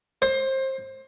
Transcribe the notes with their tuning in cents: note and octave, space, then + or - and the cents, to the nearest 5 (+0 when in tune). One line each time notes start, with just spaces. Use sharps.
C5 +25